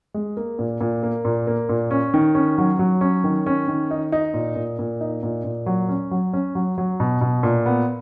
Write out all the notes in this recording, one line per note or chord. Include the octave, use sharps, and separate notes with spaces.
G#3
A#3
A#2
A#2
A#3
A#2
A#3
A#2
C#4
D#3
C#4
F#3
F#3
C#4
D#3
C#4
D#3
D#4
D#4
A#2
A#2
A#2
D#4
A#2
A#2
F#3
C#4
F#3
C#4
F#3
F#3
B2
B2
A#2
B3